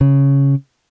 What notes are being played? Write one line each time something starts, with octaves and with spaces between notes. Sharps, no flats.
C#3